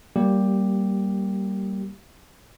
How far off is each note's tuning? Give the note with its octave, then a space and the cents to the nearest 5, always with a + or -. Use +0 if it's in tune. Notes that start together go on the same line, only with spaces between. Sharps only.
G3 -20 A#3 +0 G4 +0